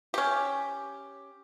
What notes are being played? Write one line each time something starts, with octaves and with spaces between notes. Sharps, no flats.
C#4 G4